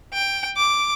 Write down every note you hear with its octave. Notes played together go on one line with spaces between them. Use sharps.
G5
D6